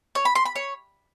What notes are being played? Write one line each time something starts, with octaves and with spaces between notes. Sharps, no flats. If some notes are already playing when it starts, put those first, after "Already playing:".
C#5
B5
C6
B5
C#5